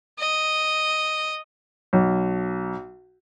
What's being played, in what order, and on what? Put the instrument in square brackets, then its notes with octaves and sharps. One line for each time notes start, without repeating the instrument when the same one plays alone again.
[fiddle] D#5
[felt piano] B1